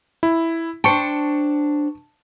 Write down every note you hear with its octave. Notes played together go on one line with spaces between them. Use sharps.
E4
D4 C5 G5 A5 C#6 C#7